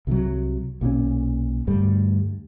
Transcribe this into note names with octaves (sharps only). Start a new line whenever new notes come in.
C2 C3 E3 F#3
B1 A#2 D#3 C#4
D2 G2 G3 A3